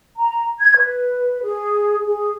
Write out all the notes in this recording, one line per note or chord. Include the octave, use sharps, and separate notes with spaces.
A#5
G#6
B4
G#4
G#4